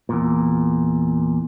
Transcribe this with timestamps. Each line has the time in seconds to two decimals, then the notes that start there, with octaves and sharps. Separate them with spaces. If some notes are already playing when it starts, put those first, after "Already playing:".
0.09 E2 A#2